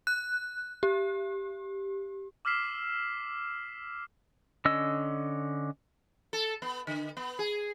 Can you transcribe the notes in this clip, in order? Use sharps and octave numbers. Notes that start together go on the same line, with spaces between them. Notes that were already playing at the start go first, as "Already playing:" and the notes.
F#6
G4
D6 E6 F6 B6 C7 E7
D3 C#4 D#5 E6
A4
B3
D3
B3
G#4